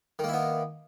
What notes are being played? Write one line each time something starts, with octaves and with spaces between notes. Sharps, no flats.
D#3 A#3 B3 E4